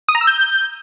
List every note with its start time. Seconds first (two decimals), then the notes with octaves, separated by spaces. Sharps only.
0.09 D#6
0.15 A#5
0.21 E6
0.27 G6